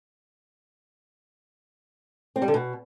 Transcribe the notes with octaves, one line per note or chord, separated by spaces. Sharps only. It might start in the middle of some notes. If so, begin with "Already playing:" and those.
C4
G3
D3
B2